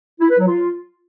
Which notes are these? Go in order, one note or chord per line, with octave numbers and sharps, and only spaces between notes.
E4
B4
F#3
F4